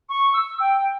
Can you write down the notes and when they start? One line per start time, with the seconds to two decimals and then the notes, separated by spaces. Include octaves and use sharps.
0.09 C#6
0.33 E6
0.60 G5